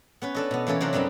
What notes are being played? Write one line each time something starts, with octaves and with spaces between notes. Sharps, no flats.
B3 C#4 B4
D4 A4 D#5
B2 B3
E3 A#3 C#4 A4 C#5
C3 F#3 D4 A4 A#4 C5
F#2 G3 B3 C4 D#4